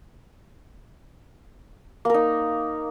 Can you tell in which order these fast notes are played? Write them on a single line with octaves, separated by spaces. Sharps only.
A#3 A#4 D#4